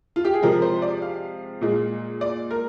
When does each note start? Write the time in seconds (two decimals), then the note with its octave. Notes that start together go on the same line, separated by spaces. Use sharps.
0.16 F4
0.25 G4
0.34 G#4
0.42 C3 F3 G#3 A#4
0.62 C5
0.82 D5
1.02 F5
1.61 A#2 G#3
2.21 D5
2.50 A#4